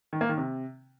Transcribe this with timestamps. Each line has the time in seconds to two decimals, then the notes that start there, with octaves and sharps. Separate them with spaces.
0.13 D#3
0.21 A#3
0.29 D#3
0.38 C3